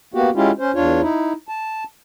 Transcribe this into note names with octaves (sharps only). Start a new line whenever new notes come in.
A#3 B3 F#4 G4
G#3 C#4 E4 F4 G4
C#4 C5
E2 D4 F4 C#5
D#4 E4
A5